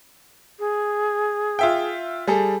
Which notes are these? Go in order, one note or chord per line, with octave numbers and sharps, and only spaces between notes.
G#4
F4 E5 G5
G3 G#4 A4